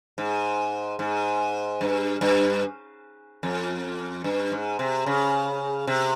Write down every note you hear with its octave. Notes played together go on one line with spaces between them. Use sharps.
G#2
G#2
G2
G2
F2
G2
G#2
C3
C#3
C3